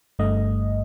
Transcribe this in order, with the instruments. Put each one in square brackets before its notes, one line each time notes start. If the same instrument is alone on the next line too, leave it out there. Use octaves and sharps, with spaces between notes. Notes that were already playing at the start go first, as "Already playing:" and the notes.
[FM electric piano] G1 G2 A3 D#5